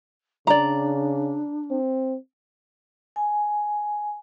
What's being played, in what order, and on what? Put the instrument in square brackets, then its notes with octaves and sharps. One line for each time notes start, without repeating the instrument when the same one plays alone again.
[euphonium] C#3 [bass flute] D4 [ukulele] D5 A#5
[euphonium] C4
[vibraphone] G#5